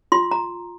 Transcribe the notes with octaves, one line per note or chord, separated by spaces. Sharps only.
F4 C6
A#5